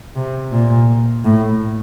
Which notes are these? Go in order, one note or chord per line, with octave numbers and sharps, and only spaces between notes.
C3
A#2
A2